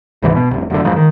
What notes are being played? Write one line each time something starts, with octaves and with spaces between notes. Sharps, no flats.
C#2 G#2 C3 E3
B2
F1 C2
F1 F#2 A#2 D3
F#1 F2 G#2
D#3